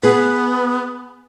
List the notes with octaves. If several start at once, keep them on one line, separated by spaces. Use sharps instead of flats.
B3 G#4 B4